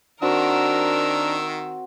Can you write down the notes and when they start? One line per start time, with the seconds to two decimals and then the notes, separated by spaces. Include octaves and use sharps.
0.22 D#3 C4 D4 F#4 A#4 E5 E6